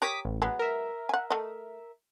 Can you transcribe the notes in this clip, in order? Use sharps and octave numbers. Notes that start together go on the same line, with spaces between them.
G4 A#4 C#5 D6 D#6 B6
A1
F#3 G#3 B3
A#4 E5
F#5 G#5
A3 D#5